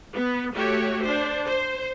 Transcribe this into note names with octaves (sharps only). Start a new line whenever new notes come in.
B3
A3 F#4 G4 C#5
D4 C5
C5